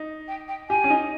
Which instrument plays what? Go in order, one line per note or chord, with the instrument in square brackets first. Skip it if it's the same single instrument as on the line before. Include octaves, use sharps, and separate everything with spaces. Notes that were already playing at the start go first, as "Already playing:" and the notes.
Already playing: [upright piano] D#4
[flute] G5
G5
[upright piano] G4 [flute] G#5
[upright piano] C#4
D#4